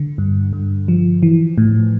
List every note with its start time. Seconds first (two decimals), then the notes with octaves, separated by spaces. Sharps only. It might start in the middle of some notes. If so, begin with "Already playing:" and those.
Already playing: D3
0.18 G2
0.53 G2
0.88 F3
1.23 E3
1.58 A2